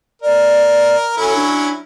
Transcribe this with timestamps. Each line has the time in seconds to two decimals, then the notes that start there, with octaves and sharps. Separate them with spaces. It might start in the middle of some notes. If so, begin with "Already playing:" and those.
0.22 A#4 D5
1.17 F#3 C#4 E4 A4
1.35 D4